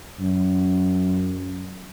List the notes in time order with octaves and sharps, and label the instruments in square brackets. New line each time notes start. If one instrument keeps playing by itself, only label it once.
[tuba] F#2